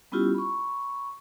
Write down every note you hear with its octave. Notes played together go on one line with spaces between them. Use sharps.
G3 B3 C#4 E4 F4 G4
B5 C#6